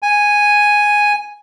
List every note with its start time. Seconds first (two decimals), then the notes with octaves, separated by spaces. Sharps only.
0.02 G#5